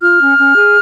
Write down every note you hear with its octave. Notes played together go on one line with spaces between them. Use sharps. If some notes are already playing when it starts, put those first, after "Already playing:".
F4 F6
C#4
C#4
G#4